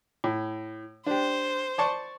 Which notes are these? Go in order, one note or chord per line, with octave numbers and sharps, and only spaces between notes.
A2
D4 G4 C5
D5 A5 C#6